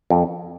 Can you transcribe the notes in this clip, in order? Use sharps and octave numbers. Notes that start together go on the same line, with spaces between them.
F2